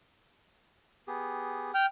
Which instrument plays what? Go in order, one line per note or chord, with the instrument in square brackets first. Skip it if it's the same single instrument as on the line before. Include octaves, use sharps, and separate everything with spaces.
[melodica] B3 G4 G#4
[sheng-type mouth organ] G5 F6